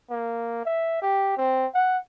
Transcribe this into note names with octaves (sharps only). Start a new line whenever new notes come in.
A#3
E5
G4
C4
F#5